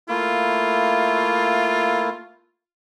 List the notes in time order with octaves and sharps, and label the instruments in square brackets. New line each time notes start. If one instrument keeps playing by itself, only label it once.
[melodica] A3 A#3 E4 [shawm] F4